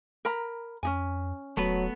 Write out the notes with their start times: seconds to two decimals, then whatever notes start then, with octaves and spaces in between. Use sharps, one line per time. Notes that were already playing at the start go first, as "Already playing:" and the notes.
0.25 A#4 A#5 B5
0.83 F2 C#4 D#4 G#5
1.57 D#1 F#3 A3 B3 B4